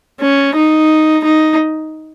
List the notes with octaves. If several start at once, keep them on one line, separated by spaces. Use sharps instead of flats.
C#4
D#4
D#4